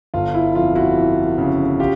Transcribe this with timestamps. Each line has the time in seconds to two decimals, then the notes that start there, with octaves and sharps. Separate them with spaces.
0.14 G1 F4
0.34 E4
0.55 F2 F4
0.75 E4 F#4
0.96 E3
1.38 C#3
1.80 F4 G4